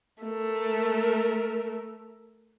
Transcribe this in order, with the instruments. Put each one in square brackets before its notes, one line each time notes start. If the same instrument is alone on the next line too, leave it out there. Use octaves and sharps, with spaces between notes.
[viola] A3 A#4